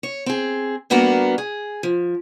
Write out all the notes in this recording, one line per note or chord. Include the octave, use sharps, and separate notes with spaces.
C#5
C4 G#4
G3 A#3 B3 D4 F#4 A#4
G#4
F3